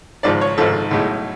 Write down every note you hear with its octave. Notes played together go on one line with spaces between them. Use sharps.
G#1 G#2 F3 D5
C#5
G#1 G#2 F3 A4
B1 A2 G#3